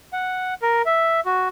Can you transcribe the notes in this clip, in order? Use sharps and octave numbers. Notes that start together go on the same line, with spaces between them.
F#5
A#4
E5
F#4